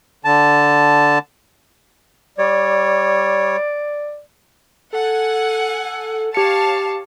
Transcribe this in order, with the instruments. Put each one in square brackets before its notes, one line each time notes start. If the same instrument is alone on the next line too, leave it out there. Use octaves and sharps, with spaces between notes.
[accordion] D3 A5
[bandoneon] G3 C#5 [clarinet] D5
[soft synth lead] A4 [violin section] F#5 G#5
[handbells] G4 C#7 [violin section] C#5 F5 A5